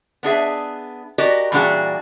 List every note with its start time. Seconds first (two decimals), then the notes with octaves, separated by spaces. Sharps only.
0.23 B3 D4 G#4 E5
1.18 F#4 G4 A#4 D5 D#5
1.52 A#2 E3 G3 D4 F#4 G#4